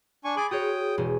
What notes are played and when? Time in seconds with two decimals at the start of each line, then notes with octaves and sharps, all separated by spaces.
0.24 D4 G#5 C#6
0.37 G#4 G#5 B5 C6 D6 A6
0.51 F#4 G#4 C#5 G5 D#6
0.97 E1 G#5